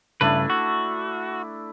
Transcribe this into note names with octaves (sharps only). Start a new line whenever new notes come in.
G2 C#3 A3 D4 E4 B4
F#4